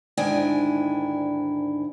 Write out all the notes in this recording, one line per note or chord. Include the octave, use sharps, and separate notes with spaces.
D2 G#2 D#3 D4 E4 G#5